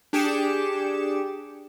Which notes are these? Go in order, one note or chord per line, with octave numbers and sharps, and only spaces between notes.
D4 G4 G#4 D6 C#7 E7